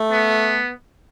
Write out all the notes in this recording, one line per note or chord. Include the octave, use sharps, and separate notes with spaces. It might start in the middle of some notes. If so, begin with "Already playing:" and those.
Already playing: A3
B3